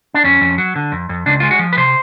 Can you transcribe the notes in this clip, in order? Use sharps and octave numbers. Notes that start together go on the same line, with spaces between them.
D4
F2 C#4
F2
F#3
D3
F2
F2
C#2 D4
G#3 F4
F#4
F3
B4
C3 C5